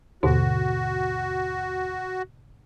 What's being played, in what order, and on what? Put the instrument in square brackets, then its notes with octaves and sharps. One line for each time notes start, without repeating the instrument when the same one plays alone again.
[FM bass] D#2 [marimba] G#2 B2 D3 [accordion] F#4